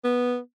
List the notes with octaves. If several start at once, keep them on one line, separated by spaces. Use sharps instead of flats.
B3